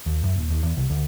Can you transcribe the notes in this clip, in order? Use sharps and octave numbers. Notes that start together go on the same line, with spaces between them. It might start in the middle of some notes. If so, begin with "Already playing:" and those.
D#2
F#2
D#1
D#2
E2
C2
D2